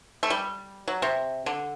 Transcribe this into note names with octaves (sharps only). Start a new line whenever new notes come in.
A3
G3
F#3
C3
D3